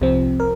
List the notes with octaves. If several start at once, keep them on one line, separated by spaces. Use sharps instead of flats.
C2 C3 F3 C4
A#4